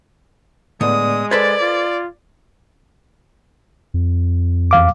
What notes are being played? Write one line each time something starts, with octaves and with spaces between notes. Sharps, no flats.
A2 D3 G#3 B3 D5 D#6
A4 B4 C5 D5 G#6 A6
F4
F2
E2 F5 D6